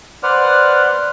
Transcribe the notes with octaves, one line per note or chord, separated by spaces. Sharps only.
B4 C5 D5 F#5 F6